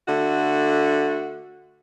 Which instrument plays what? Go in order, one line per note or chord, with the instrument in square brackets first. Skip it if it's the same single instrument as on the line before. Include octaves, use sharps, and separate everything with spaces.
[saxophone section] D3 A3 F#4